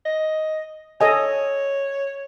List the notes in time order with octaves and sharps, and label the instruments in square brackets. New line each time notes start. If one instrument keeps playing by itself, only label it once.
[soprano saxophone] D#5
[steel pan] A4 D#5 G#5 [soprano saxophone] C#5